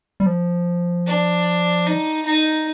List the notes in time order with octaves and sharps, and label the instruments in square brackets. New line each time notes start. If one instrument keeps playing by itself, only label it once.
[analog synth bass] G3
F3
[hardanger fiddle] D4
D#4
D#4